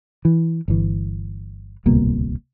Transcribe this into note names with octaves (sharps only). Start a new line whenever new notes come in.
E3
G1 E3
D1 C2 B2 A#3